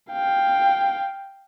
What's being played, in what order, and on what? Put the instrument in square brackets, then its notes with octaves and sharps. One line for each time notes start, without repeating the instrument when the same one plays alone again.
[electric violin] F5 G5